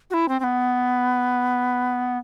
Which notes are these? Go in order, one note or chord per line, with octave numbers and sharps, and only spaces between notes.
F#4
E4
C4
C4
B3